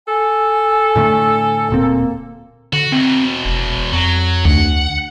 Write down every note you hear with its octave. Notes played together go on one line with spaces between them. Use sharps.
A4 G#5
A2 D3 A3
D1 A#2 A#3 C4
D3 F#4
E2 B2 C4
F1
F2 F#3
D2 F#5